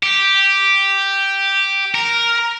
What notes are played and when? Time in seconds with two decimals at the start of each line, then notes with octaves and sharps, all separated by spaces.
0.03 G4
1.95 A#4